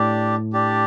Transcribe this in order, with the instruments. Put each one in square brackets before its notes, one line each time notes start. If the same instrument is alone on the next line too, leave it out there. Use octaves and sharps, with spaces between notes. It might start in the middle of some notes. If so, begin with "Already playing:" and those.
Already playing: [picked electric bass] A2 [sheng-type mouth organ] D4 G4 D5
[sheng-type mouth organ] D4 G4 D5